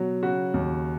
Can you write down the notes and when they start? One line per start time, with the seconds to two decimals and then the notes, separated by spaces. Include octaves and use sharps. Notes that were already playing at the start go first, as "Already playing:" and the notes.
Already playing: B2 F#3
0.23 C#3 F#4
0.54 D#2